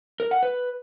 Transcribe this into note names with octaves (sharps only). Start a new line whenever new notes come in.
A#4
F#5
B4